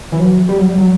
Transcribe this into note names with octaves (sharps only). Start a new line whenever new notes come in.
E3
F#3
G3
F#3
G3
F#3